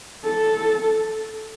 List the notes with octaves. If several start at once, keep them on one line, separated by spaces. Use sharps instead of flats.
A4